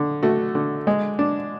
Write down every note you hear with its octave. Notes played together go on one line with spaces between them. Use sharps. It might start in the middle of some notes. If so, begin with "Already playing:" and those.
Already playing: D3
A3 F#4
D3
G#3
D4